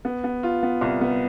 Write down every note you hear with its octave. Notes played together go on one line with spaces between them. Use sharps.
B3
B3
F4
B3
C2
B3